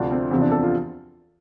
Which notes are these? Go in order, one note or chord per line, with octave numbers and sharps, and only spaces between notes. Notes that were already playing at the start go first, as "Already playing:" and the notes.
Already playing: D2 C3 F3 D4
C4
E2 C3 F3 C4
D4
A4
F4